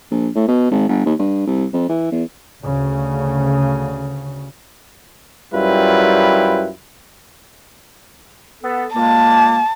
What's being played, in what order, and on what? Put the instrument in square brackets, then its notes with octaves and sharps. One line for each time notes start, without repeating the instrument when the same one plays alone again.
[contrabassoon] A#1
A2
B2
G#1
G1
D#2
G2
C2
F2
E3
E2
[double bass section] D2 C#3
[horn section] F#2 G3 E4 F4 B4 G5
[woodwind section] B3 A4
[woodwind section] A#2 G#3 A#3 [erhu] A5